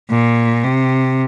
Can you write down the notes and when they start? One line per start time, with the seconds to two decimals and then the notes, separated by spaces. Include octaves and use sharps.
0.10 A#2
0.64 C3